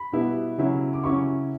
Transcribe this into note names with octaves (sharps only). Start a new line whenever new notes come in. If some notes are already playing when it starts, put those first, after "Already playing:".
Already playing: B5
B2 G3 B3 E4
C#3 F#3 C#4 E4
D6
C#3 F#3 C#4 E4 C#6